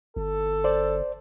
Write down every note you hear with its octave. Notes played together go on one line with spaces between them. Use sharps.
G1 A4
C5 D5